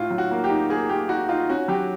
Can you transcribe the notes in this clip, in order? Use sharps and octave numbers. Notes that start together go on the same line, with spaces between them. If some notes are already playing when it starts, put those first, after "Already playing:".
Already playing: A2 F4
F#3
F#4
A#3
G4
D#4
A#3 G#4
A#3 G4
D#4 F#4
D#4 F4
C#4 F#4
F#3 G4